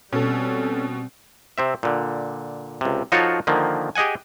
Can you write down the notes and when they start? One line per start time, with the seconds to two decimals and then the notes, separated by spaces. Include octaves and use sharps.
0.13 B2 G3 C4 C#4 A4
1.58 C3 C4 E5
1.83 A#2 D3
2.81 C#2 C3
3.12 F3 D#4 F4 F#4 A4 C#5
3.47 D3 D#3 F3 A#3
3.96 G4 G#4 D#5 F#5 G#5